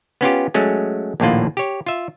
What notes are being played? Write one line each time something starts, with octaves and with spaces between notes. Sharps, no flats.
B3 C#4 F4 G4
F#3 G#3 A3 C#4
A#1 D#2 A2 A#3 F4 F#5
G4 C#5
F4 E5